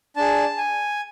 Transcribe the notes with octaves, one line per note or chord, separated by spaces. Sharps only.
D4 G#4 A5
G#5